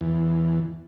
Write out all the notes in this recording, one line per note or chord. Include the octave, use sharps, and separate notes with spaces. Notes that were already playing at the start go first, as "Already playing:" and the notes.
E2